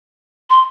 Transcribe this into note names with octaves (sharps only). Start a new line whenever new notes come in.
C6